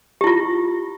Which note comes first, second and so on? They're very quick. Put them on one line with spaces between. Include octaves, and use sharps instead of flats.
G4 E4 F4